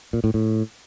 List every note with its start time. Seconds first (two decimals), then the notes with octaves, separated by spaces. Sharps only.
0.13 A#2
0.24 A2
0.34 A2